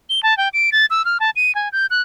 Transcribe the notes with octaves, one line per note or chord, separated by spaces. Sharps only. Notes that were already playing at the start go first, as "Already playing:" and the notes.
G7
A5
G5
D7
A6
E6
F6
A5
D#7
G#5
G6
F#6